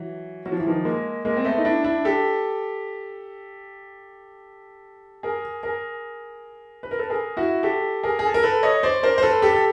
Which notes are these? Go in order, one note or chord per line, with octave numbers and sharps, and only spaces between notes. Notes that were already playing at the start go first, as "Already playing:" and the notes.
Already playing: E3 F#3
F#3
F3
E3
D#3 F3
G#3 A#3
G#3 A#3
C4
A3 B3
D#4
D4 E4
D4 E4
G4 A4
G#4 A#4
G#4 A#4
B4
A#4
A4 B4
G#4 A#4
E4 F#4
G4 A4
G#4 A#4
G#4
A4
A#4
A4 B4
C#5 D#5
C5 D5
A#4 C5
C5
A4 B4
G4 A4
A4